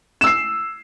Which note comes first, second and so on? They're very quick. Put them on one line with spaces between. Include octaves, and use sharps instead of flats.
E7 E6 C7